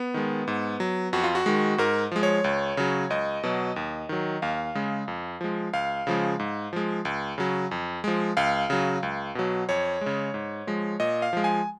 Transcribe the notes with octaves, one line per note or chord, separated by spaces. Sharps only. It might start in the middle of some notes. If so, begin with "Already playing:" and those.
Already playing: B3
D#3 G#3
G#2
F#3
F2 F#4
F4
F#4
D#3 G#3
G#2 A#4
F3 G#3
C#5
C#2
C#3 F#3
C#2 D#5
B2 F#3
D#2
D#3 F#3
D#2 F5
C#3 G#3
F2
F3 G#3
C#2 F5
C#3 F3 G#3
G#2
F3 G#3
C#2
C#3 F#3
F2
F3 G#3
C#2 F5
C#3 F#3
C#2
B2 F#3
F2 C#5
C#3 G#3
G#2
F3 G#3
A#2 D#5
F5
F3 G#3
G#5